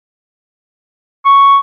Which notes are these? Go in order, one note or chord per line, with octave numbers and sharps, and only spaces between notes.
C#6